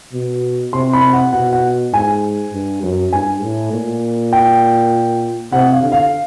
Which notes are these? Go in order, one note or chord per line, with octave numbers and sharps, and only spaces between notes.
B2
C3 C6
B5
F#5
B2 F#5
F#5
G#2 G#5
G2
F#2
G2 G#5
A2
A#2
G5
C3 F#5
F5
D3
F5